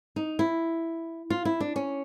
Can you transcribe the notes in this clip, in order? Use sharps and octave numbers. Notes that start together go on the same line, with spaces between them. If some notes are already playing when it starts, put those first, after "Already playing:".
D#4
E4
F4
E4
D4
C#4